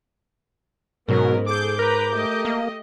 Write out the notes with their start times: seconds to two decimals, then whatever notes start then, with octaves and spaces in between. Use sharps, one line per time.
1.08 G#2 B2 F#3 B3 C#4 A#4
1.46 G#4 A4 D6 G6
1.79 A#4 B4 A#5
2.11 A3 G4 D#5
2.45 A#3